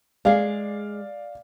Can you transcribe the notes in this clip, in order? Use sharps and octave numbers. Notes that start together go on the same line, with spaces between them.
G#3 G#4 D5 F5